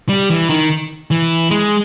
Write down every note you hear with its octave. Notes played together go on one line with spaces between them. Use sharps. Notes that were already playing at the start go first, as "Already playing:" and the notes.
G3
E3
D#3
E3
G#3